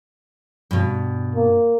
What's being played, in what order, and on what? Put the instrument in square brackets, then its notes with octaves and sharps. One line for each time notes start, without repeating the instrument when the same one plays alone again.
[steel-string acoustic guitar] G2 B2
[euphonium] A#3